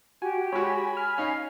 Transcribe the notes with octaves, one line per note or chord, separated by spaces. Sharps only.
F#4 G4 G#5
G#3 F#4 C#5 G#5 B5
F6
C#4 D#4 C#5 F5 F6